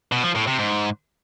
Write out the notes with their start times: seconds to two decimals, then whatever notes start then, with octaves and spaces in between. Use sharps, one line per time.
0.12 B2
0.24 F3
0.35 A2
0.47 C3
0.59 G#2